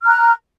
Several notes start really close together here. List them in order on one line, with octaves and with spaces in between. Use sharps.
F6 A#5 F#6